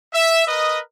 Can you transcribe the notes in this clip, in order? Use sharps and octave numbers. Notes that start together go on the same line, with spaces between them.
E5
A#4 B4 D#5